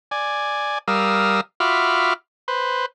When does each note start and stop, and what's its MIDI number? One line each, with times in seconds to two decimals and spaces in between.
0.11 0.78 74
0.11 0.78 80
0.88 1.41 55
0.88 1.41 70
0.88 1.41 77
0.88 1.41 87
0.88 1.41 88
1.60 2.14 65
1.60 2.14 66
1.60 2.14 76
1.60 2.14 83
1.60 2.14 86
1.60 2.14 89
2.48 2.86 71
2.48 2.86 72